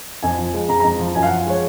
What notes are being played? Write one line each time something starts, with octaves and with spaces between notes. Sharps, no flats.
F2 G#5
F3
G#3
F2 A#5
A#5
F2
F3
F#2 G#5
F5
F#5
F3
G#3 C#5